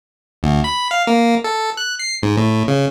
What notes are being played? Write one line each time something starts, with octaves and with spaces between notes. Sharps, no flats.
D2
B5
F5
A#3
A4
F#6
C7
G#2
A2
C#3